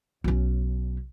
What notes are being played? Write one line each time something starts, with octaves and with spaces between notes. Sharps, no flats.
B1 C#4